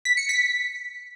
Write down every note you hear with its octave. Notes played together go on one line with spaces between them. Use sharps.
B6
C#7
B6